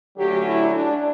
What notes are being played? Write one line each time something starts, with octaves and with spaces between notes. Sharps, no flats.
D3 F#3 A3 C#4 G4
E4
D4